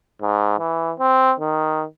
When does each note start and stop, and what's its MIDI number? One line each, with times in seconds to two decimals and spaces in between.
0.22 0.56 44
0.59 0.93 52
0.99 1.33 60
1.40 1.85 51